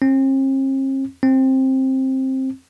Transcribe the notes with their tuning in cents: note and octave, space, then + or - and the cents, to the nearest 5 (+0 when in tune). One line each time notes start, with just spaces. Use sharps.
C4 +45
C4 +15